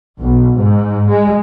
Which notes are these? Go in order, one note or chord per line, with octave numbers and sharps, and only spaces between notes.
B1
G#2
G#3